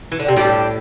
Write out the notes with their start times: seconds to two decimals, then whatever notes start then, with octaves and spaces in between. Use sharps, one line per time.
0.12 E3
0.20 D3
0.28 C3
0.36 A2 G3 D4 G4